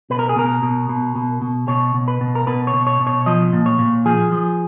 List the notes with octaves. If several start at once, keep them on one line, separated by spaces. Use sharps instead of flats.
B2 B4
A#4
G#4
B2 A#4
B2
B2
B2
B2
B2 C#5
B2
B4
B2
A#4
B2 B4
C#5
B2
C#5
B2
C#5
F3 D#5
A#2
C#5
A#2
F3 G#4
F3